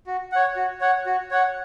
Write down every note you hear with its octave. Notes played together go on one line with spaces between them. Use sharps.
F#4
C#5 F#5
F#4
C#5 F#5
F#4
C#5 F#5